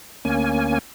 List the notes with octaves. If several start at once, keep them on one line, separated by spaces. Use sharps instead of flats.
D2 A#3 C#4 G#5